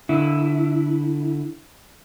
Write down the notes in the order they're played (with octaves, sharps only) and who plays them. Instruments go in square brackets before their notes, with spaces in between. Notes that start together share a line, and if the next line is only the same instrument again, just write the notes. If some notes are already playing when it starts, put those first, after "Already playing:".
[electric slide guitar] D3 E4